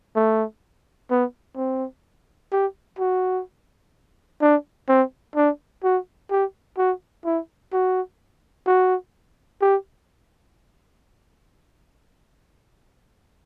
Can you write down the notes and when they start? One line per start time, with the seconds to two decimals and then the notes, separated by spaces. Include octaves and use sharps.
0.16 A3
1.10 B3
1.57 C4
2.52 G4
2.99 F#4
4.41 D4
4.88 C4
5.36 D4
5.84 F#4
6.30 G4
6.78 F#4
7.25 E4
7.73 F#4
8.67 F#4
9.61 G4